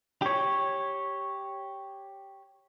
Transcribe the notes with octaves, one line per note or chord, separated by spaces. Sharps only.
G4 C#5